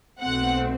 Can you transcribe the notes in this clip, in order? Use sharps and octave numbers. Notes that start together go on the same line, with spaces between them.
B1 B2 A3 C4 F#5